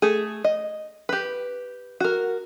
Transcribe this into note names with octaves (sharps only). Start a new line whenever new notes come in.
A3 G#4
D#5
G4 B4
F#4 A#4